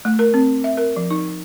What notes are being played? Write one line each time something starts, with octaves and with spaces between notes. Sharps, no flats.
A3
A#4
C4
E5
A#4
F3
D#4